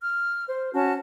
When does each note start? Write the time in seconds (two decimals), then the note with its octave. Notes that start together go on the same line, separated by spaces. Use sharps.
0.03 F6
0.48 C5
0.74 C#4 F#4 A5